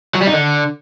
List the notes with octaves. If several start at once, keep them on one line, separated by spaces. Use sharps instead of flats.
F#3
G3
D#4
D3